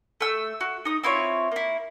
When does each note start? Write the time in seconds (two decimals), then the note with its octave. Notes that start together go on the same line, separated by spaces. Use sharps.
0.21 A3 E6
0.60 F#4
0.85 D#4 D#6
1.03 C4 E4 F4 C#5
1.51 A#3 E4